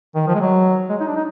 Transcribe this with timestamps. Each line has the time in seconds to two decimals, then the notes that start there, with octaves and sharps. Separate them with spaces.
0.15 D#3
0.27 F3
0.35 G#3
0.40 F#3
0.89 G#3
1.00 D#4
1.07 D4
1.16 D#4